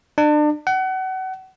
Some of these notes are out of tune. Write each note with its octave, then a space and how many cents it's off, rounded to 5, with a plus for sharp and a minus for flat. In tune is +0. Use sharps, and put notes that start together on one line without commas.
D4 +35
F#5 +30